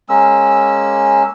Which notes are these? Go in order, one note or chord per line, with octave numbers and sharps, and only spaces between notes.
G#3 A#3 C#4 E6